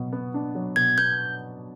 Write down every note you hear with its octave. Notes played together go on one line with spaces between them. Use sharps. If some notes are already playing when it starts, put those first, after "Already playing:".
Already playing: B2 F#3
B3
D4
F#3
B2 G#6
B3 G6